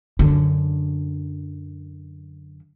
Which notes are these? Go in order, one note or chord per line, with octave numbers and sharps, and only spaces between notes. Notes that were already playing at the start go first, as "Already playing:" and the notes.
F#2 D3